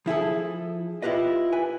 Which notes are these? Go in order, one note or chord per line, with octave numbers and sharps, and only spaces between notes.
F3 E4 G#4 A4
E4 F4 G4 B4 D#5
B4 G#5